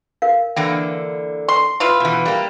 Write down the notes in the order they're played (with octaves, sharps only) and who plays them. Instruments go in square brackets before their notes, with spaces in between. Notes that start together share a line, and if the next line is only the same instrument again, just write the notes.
[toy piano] A#4 F5
[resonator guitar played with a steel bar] D3 E3 A#3 [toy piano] G5
[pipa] C6
E4 F4 B4
[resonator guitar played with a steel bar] B2 E3
G3 A#3